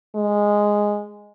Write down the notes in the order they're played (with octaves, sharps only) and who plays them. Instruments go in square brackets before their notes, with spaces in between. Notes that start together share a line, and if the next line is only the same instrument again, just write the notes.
[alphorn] G#3